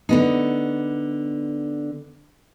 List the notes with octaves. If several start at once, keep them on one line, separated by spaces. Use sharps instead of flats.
D3 B3 D#4